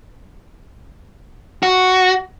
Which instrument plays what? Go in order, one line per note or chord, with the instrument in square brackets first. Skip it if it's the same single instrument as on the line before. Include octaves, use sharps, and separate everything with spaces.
[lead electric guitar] F#4